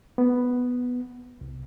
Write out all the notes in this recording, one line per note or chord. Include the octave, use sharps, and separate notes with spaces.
B3
C2